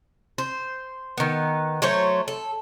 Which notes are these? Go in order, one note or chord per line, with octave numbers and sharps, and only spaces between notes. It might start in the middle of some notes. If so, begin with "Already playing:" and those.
C5
D#3 B3
F#3 A3 C5 C#5
A4